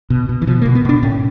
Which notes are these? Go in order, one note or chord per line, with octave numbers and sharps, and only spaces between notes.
B2
B2
E3
B2 F3
A#3
B2
B3
B2 D4
A2 C#4